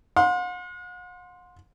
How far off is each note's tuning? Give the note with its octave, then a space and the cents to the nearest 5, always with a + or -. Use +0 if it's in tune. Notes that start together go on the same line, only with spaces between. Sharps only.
F#5 -45 C6 +0